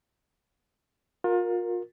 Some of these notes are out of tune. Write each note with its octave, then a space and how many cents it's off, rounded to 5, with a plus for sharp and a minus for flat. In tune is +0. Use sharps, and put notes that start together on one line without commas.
F4 +35 A#4 +0